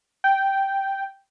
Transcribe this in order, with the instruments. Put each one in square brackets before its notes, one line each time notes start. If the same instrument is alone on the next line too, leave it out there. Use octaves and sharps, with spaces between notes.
[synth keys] G5